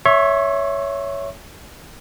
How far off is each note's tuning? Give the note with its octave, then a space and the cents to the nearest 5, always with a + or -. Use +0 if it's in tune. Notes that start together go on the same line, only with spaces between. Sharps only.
C#5 +10 E5 +0 C#6 -45